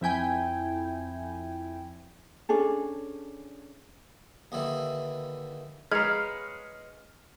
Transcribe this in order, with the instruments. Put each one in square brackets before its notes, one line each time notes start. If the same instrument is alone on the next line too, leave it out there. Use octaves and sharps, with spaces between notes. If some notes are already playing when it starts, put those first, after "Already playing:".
[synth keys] F2 E4 G5 G#5
[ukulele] C#4 D4 G#4 A4
[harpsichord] D#2 D3 E3
[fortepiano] G#3 [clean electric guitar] B4 C#5 F5 [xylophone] A#5 G#6 [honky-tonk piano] F6